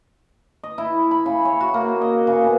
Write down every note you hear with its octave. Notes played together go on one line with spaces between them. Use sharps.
D#5
E4
B5
C#3
C#5
F#4
A#3
D#5
C#3
B2